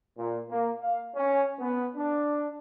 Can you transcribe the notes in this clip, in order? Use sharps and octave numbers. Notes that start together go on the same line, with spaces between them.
A#2
A#3
F5
C#4
B3
D4